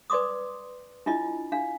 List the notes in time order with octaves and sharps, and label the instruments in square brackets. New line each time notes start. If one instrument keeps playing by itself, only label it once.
[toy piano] B4 D5 C6 D6 D#6
D4 E4 F4 D#5
D4 F5